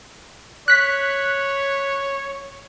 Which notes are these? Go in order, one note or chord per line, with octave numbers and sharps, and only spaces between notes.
C#5 F#6 B6